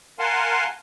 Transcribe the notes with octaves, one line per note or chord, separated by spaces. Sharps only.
A#4 F5 F#5 G#5 A5 C6